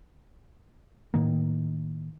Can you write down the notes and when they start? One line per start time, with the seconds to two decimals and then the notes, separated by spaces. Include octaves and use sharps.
1.14 A2 D#3 A#3